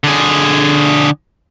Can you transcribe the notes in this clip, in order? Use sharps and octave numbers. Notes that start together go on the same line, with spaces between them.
D3 G#4